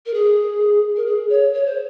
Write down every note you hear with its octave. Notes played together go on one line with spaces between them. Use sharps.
A#4
G#4
A#4
G#4
C#5
C#5
C5